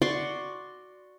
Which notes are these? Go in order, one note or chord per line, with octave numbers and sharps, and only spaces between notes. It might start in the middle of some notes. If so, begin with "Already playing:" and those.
F#4 D5 C6 C#6